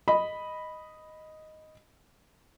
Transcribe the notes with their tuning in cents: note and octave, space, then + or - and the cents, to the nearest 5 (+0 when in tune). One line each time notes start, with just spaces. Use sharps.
D#5 +0 B5 +0